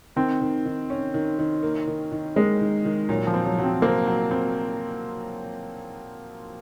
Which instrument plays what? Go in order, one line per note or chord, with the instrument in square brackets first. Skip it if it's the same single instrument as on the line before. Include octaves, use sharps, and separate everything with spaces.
[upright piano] D#3 [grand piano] C4
[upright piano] D#3
D#3
C#4
D#3
D#3
A#3
D#3
D#3
[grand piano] G#3 [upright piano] A#3
[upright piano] D#3
D#3
[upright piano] A#2 [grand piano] F#3
[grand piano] F3
[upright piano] C4
[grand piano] F#3
[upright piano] F#3
[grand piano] C4
[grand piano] A#3 [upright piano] C4
[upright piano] F#3
C4